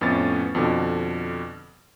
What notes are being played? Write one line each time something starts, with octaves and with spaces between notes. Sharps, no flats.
F2 A2 B3 C#4 A6
F2 B2 D3